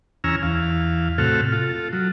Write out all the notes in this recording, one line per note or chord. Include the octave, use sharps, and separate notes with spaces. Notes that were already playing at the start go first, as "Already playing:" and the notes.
E2 C#4 G#5 A#5 E6 F6
E2 F5
A2 C3 F#4 A4 F6
F4 A4
F#3